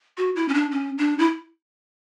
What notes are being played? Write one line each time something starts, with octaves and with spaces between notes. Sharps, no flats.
F#4
E4
C#4
D4
C#4
D4
E4